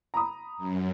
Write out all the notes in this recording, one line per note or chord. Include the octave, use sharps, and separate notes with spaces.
A#5 B5 D#6
F#2